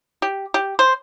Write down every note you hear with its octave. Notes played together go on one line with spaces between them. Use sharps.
G4
G4
C5